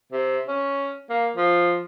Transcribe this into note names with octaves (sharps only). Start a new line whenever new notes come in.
C3
C#4
A#3
F3